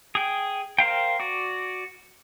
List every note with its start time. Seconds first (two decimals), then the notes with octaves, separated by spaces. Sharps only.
0.15 G#4 G5
0.78 A#4 C5 F5 G5
1.19 F#4 D5